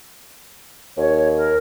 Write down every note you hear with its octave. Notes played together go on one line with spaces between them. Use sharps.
D#2 C#5
A#4